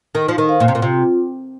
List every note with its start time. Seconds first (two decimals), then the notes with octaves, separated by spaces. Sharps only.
0.15 D#3 D#4
0.28 F3
0.38 D#3
0.49 C5 F5
0.60 A#2
0.68 C3
0.75 A#2
0.82 C3 F4